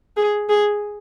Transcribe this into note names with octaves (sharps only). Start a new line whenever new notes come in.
G#4
G#4